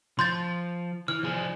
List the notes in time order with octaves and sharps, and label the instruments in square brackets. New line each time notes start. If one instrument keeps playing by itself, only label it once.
[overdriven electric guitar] F3 [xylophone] C6 G6 A6
[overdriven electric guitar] E3 [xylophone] F6
[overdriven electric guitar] F3 G#4